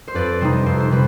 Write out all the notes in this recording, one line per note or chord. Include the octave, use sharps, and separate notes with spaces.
C5
F2 B4 D5
C3 G3 C4 D#4 C5
F2 C5
C5
C3 G3 B4